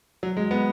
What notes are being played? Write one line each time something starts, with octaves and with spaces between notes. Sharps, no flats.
F#3
G#3
B3